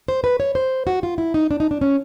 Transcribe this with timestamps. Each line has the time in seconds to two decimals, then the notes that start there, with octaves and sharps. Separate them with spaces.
0.08 C5
0.24 B4
0.40 C#5
0.55 C5
0.87 F#4
1.03 F4
1.18 E4
1.34 D#4
1.51 D4
1.60 D#4
1.71 D4
1.81 C#4